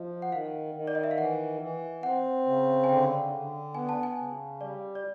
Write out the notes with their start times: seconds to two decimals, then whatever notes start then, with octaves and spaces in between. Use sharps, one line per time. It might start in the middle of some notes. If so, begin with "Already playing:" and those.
Already playing: F3 D#5
0.22 F#5
0.32 D#3 F5
0.75 D#3
0.88 D5
0.95 D#5
1.04 E5
1.11 F5
1.18 E3 F#5
1.61 E3
2.03 C4 F#5
2.46 C#3
2.84 G#5
2.89 D3 G5
3.32 D3
3.75 B3 G#5
3.89 A5
4.03 G#5
4.18 C#3
4.61 G3 D5
4.95 D5